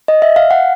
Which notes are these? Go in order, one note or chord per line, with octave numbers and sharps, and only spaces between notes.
D#5
E5
F5
F#5